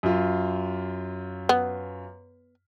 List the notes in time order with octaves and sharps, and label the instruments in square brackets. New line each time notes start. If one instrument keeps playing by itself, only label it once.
[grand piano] F#2 F4
[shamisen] B3